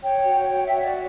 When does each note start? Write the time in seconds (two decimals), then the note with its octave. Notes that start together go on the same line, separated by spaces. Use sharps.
0.02 C#5 G5
0.25 F#4
0.49 C#5 G5
0.65 E5
0.73 F#4
0.81 D5